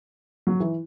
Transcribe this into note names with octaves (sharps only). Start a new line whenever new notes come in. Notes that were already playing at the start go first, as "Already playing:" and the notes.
F#3
E3